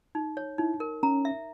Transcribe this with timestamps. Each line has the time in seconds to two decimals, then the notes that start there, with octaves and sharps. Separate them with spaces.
0.15 D#4
0.37 C#5
0.58 D#4 E4
0.80 A#4
1.03 C#4 A#5
1.25 E5